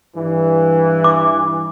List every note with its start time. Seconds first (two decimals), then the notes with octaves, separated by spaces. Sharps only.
0.14 G2 E3
1.04 D6